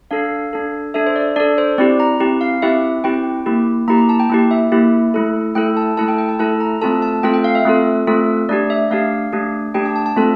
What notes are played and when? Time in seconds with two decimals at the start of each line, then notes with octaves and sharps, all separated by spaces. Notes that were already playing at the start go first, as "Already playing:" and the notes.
0.11 D4 A4 F5
0.53 D4 A4
0.94 D4 A4 E5
1.07 C5
1.16 D5
1.36 D4 A4 D5
1.58 C5
1.78 C4 E4 G4 D5
2.00 A#5
2.20 C4 E4 G4
2.41 F5
2.62 C4 E4 G4 E5
3.04 C4 E4 G4 G5
3.46 A#3 E4 G4
3.88 A#3 E4 G4 A#5
3.98 A#5
4.09 A5
4.20 G5
4.30 A#3 E4 G4
4.51 E5
4.72 A#3 E4 G4
5.14 A3 E4 A4
5.55 A3 E4 A4 G5
5.77 A5
5.97 A3 E4 A4 A5
6.08 G5
6.18 G5
6.29 A5
6.39 A3 E4 A4 A5
6.60 A#5
6.81 A3 C4 F4 A4 A5
7.02 A5
7.23 A3 C4 F4 A4 G5
7.34 G5
7.44 F5
7.55 E5
7.65 A3 C4 F4 A4
8.07 A3 C4 F4 A4
8.49 A3 D4 G4 D5
8.70 E5
8.91 A3 D4 G4 F5
9.33 A3 D4 G4
9.74 A3 D4 G4 G5
9.85 A5
9.96 A5
10.06 A5
10.16 A3 C4 F4 A4